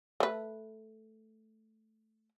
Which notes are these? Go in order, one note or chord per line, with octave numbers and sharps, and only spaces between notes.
A3 B4